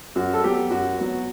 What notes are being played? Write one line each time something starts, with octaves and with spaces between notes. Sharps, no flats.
F#2 F#4
A4
F#3 B3 G4
F#2 F#4
F#3 B3